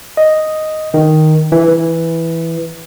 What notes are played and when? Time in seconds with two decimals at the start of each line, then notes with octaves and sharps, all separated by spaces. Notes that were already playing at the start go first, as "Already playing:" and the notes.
0.17 D#5
0.94 D#3
1.52 E3
1.68 E3